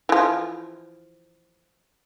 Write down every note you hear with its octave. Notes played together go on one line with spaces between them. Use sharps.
E3 F3